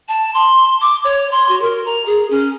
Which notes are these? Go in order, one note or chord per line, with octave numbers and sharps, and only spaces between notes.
A5
C6
D6
C#5
C6
F#4
A#4
A#5
G#4
C#4